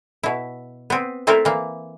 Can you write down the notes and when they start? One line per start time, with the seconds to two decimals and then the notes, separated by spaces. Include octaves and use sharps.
0.23 B2 E4
0.90 B3 C4
1.27 A3 C4 E4 A4 A#4
1.45 E3 A#3